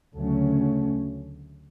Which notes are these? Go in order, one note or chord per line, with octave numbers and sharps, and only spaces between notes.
D2 C#3 F#3 A3 C#4